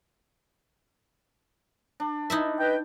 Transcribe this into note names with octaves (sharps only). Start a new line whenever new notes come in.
D4
D#4 E4 E5
B4 D#5 G5